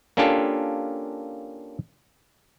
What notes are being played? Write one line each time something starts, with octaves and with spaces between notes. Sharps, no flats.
A#3 C#4 D4 F4 G4 A4